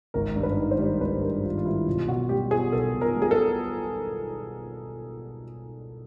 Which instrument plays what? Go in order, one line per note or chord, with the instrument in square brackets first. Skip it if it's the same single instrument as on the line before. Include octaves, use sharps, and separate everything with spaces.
[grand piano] G#1 [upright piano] A#4
[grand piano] G2
[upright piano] B4
[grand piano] D#3
[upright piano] C5
[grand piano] G3
[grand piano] G#1 [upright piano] B4
[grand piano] G2 [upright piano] A#4
[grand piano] D#3 [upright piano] F4
[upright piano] F4
[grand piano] G3 [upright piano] E4
[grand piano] B1 [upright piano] F4
[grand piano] B2 [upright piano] F#4
[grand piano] G3 [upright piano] G4
[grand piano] B3 [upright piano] G#4
[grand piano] B1 [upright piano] A4
[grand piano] B2
[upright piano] A#4
[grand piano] G3
[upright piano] G#4
A4
[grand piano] B3